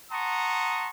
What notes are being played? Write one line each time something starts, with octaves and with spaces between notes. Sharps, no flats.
F#5 A5 A#5 C6 C#6 D#6